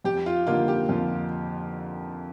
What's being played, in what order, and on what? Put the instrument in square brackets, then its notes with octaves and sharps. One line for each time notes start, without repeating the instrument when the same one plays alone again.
[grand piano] F2 [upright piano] G4
[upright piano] F4
[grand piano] D3 G3 A#3 D#4 [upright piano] F4
[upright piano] G4
[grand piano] F2 [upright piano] F4